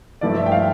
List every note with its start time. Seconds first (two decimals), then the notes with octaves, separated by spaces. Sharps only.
0.21 G2 F3 A3 E4 D5
0.37 E5
0.46 G5
0.52 F5